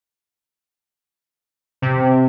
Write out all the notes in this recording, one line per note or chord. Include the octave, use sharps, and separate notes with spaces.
C3